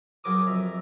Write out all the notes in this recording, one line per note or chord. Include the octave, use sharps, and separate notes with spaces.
F#2 C#3 F#3 A#4 D6 D#6
F2 E5 A#5